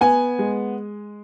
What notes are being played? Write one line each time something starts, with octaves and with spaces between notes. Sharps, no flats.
B3 G#5
G#3